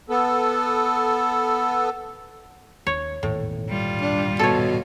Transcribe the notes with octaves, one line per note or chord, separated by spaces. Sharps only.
B3 A4
D#2 C#5
D#1 G#1 E2 A2
G3 F4
D4
B2 A4 C#5